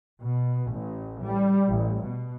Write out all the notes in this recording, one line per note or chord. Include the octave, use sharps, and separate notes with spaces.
B2
A1
G3
A1
B2